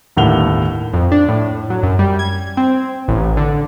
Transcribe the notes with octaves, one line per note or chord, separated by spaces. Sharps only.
G1 D#2 A2 F#5 F7 G7
F2
D4
A2
F#3
F#2
G3
G#6
C4
A1
D3